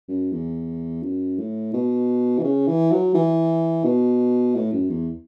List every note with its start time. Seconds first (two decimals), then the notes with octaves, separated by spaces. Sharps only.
0.09 F#2
0.33 E2
1.03 F#2
1.38 A2
1.74 B2
2.38 E3
2.44 C#3
2.67 E3
2.91 F#3
3.14 E3
3.84 B2
4.55 A2
4.73 F#2
4.90 E2